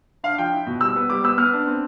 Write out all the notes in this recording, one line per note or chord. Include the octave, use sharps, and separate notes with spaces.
D4 F5
F3 G5
E4
B2
G3 E6
B3
G3 D6
B3 E6
B3 F6
D4
C4